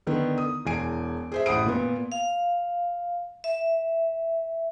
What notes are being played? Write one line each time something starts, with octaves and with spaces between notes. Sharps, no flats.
D3 D#3 B3
D#6
E1 E2 G#5 D7
G#4 C5 E5
A1 F#5 B5 D#6 D7
A#2 B3
F5
E5